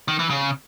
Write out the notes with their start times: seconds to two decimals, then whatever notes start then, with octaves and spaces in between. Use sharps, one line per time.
0.08 D#3
0.19 E3
0.30 C#3